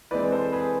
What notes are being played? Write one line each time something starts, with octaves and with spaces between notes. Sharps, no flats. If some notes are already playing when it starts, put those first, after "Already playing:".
E3 G#3 C4 B4 D5
A4 C5
G#4 B4